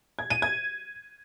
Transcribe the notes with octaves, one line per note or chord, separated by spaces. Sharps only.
G#6
D#7
G#6